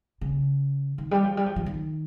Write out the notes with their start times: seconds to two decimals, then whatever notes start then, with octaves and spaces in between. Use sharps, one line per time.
0.21 C#3
0.98 D#3
1.11 G3
1.24 F3
1.37 G3
1.46 F3
1.56 F3
1.66 D#3